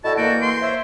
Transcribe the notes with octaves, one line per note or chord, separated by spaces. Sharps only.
A2 E4 F#4 A4 D5 D#5 A5
E3 A#3 F#4 G6 D7
C6 D7
C5 C#5 E5